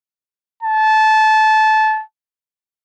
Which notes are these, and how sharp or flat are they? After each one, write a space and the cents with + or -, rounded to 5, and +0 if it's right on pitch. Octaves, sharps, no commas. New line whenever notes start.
A5 -20